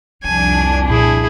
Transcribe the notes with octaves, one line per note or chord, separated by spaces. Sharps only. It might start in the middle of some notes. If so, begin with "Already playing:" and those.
C2 F2 D4 D#4 G#5
A#2 E4 G#4